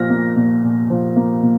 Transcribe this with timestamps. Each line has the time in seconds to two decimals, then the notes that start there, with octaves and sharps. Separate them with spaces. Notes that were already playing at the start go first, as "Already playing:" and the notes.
Already playing: A#2 F3 F6 A#6
0.10 A#3
0.36 A#2
0.63 A#2
0.90 F3
1.16 A#3
1.42 A#2